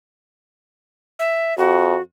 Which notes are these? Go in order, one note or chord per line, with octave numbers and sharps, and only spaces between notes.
E5
F2 F#4